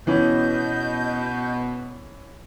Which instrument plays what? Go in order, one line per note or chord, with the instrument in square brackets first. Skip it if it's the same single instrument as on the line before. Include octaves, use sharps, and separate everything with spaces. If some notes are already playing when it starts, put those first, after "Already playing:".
[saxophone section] B2 [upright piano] E3 C#4 [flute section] D#5 G6